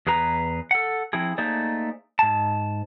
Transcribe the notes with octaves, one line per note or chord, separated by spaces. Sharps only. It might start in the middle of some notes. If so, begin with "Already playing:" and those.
E2 G#4 B4 A#5
A4 F#5
F3 C4 E4 G#4
A3 A#3 D#4 G#4 C5 D5
G#2 A5